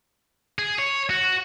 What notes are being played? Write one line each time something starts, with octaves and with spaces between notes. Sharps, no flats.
G#4
C#5
F#4